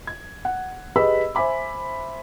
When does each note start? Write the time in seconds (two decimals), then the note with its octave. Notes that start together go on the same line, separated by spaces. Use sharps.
0.07 G#6
0.45 F#5
0.96 G4 G#4 B4 D#5 B5 E6
1.35 C5 E5 G#5 B5 D6